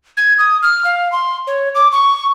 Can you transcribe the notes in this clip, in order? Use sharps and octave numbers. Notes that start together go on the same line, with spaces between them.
G#6
D#6
F6
F5
C6
C#5
D6
C#6